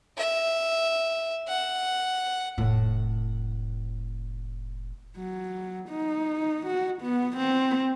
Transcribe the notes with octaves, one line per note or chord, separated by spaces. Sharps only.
E5
F#5
F1 A2
F#3
D#4
F#4
B3
C4